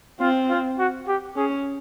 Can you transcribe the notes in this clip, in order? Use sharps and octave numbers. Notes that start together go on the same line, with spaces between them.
C4 F4
F4
F#4
G4
C#4 G#4